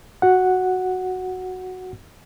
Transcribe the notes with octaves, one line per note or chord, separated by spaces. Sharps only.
F#4 F#5